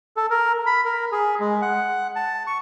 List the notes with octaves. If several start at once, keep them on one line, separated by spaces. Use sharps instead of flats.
A4
A#4
B5
A#4
G#4
G#3
F#5
A5
C#6